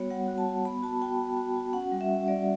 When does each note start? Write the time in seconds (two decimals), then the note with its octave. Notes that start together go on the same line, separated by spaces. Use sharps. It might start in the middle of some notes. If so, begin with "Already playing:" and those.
Already playing: G3 B3 F#4 C#5
0.11 G3 F#5
0.28 F#4
0.38 A5
0.47 F#4
0.65 B3 B5
0.83 F#4 A5
1.02 F#4 G5
1.19 B3
1.37 F#4
1.56 F#4
1.73 C#4 F#5
1.92 G3
2.01 E5
2.10 C#4
2.28 G3 D5